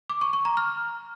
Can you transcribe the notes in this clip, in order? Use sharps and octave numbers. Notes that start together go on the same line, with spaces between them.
D6
C#6
C#6
A#5
F6